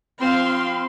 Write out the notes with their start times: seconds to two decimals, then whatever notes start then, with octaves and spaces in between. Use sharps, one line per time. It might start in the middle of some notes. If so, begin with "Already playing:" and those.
0.20 F3 C4 F5 C6